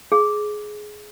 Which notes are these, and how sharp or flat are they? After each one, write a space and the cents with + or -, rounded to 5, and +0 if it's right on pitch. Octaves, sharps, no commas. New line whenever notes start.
G#4 +15